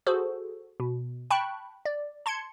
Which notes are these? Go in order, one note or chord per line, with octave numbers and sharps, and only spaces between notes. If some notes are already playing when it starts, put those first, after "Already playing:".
F#4 G#4 A4 C5
B2
G5 A5 B5 C#6 F#6
D5
A5 C6 G#6 C#7